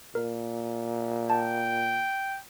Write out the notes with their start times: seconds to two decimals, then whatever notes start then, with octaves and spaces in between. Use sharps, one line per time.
0.15 A#2 A#4
1.30 G5 A5